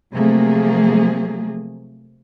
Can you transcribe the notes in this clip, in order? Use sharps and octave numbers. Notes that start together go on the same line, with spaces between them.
C3 F3 F#3 A3 A#3 G#4